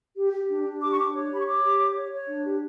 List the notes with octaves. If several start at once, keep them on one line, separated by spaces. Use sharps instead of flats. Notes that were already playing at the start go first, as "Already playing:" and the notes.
G4
G4
D4
D4
G4 D6
C#6
D4 D6
C#5
G4 B5
C#6
C#5 D6
G4
C#5
C#5
C#5
D4
G4